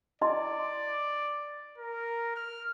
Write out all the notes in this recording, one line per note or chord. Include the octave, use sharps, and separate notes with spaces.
E4 D5 D#5 C6
A#4
F6